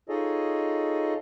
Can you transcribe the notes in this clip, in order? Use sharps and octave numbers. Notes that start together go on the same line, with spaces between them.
D#4 F4 G#4 A4 C#5 D#5